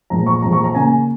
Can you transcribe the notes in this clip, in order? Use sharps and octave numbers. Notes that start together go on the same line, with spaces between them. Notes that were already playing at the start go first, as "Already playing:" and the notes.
A#2 F3 G#3 A#5
C#6
A#2 F3 G#3 A#5
C#6
A#5
C#3 A#3 G#5